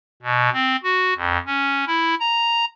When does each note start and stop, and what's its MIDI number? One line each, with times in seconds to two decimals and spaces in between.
0.22 0.49 47
0.53 0.76 60
0.83 1.13 66
1.16 1.38 41
1.46 1.85 61
1.87 2.15 64
2.20 2.65 82